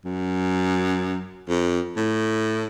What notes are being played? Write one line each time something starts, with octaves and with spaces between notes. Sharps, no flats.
F#2
F2
A2